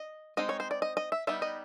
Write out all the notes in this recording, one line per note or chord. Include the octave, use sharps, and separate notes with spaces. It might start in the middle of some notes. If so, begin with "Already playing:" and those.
Already playing: D#5
G#3 C4 D#4 D#5
C#5
C5
D5
D#5
D#5
E5
G3 B3 D#4 E5
D#5